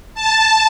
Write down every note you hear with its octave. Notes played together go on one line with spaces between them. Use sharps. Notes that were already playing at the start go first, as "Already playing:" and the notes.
A5